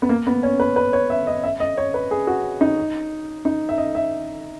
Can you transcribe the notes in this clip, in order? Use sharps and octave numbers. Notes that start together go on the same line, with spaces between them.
B3
A#3
B3
C#4
B4
B4
C#5
E5
D#5
E5
D#5
C#5
B4
G#4
F#4
D#4
D#4
E5
D#5
E5